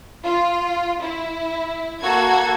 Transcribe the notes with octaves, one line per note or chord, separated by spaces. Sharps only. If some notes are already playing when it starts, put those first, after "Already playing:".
F4
E4
A#3 F#4 A4 G#6